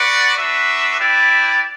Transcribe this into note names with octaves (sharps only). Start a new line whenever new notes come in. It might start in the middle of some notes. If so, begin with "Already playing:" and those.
Already playing: F#4 B4 D5 F#5
D4 F#4 B4 E5
E4 G4 B4 D5